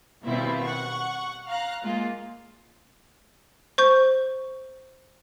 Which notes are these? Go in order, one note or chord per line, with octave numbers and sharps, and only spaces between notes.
B2 D#3 G3 C4 E4 F4
F#5 C#6
F5 A#5 F6 F#6
G#3 A#3 F4
C5 C#6 G6